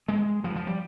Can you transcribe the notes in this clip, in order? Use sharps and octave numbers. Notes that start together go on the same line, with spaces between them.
G2 G#3
G2 F3
F3
G3